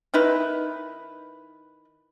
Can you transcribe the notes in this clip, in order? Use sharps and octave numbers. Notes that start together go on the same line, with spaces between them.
D#3 D#4 E4 B4